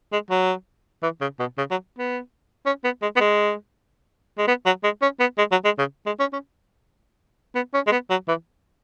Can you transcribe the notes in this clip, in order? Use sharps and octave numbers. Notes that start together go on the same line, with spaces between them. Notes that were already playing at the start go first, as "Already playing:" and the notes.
G#3
F#3
E3
C#3
B2
C#3
F#3
B3
C#4
B3
G#3
B3
G#3
G#3
B3
F#3
G#3
C#4
B3
G#3
F#3
G#3
C#3
G#3
C#4
C#4
B3
C#4
G#3
B3
F#3
E3